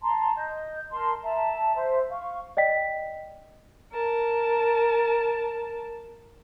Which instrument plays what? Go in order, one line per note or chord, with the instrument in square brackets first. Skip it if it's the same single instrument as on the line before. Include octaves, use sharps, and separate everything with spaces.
[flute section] A5 A#5 C6
D#5 G6
A#4 A5 C6
E5 A5 A#5
C5 E5
F5 C#6
[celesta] D5 D#5 G5 B6
[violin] A#4 A5